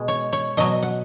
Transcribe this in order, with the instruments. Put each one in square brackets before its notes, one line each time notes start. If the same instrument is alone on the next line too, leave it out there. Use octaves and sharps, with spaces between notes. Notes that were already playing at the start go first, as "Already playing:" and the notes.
Already playing: [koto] B2 G#3
C#5
C#5
B2 F#3 D#5
F#5